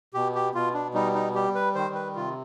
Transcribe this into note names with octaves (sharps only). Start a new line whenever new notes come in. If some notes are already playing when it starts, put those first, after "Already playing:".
B2 G4
G4
B2 F4
D4
G3 D#4
D#4
G3 G4
B4
D#3 C5
B4
C3 F4